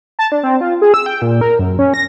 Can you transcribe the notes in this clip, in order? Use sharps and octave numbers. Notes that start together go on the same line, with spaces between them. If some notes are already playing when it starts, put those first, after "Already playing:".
A5
D4
C4
F4
G#4
E6
G5
A#2
A#4
F#2
C#4
A#6